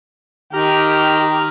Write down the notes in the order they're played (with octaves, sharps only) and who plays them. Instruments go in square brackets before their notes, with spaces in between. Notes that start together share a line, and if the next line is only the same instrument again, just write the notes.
[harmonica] D#3 [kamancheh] G4 [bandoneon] A#5 F6